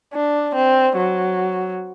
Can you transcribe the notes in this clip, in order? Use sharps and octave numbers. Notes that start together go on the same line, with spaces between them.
D4
C4
F#3